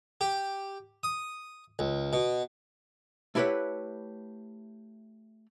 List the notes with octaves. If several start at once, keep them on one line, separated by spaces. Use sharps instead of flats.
G4
D#6
C#2
B2
A3 E4 G4 B4 C#5 F#5